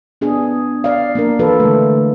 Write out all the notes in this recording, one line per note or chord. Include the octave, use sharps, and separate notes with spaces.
B3 D4 G#4
D5 F5
A#3 D4 A#4
E3 F4 A4 B4
D3 G#3 A3